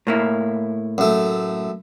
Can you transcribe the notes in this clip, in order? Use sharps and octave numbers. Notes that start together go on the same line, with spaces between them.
A2 A#3 E4
F#2 A3